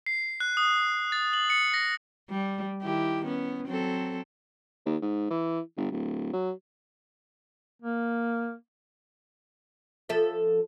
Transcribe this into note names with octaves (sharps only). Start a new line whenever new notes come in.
C7
F#6
D#6
A6
F#7
C#7
A#6
G3
D#3 E4 G4
B3 C#4
F#3 C4 A4
D#2
G#2
E3
G1
D1
F#3
A#3
F3 A4 E5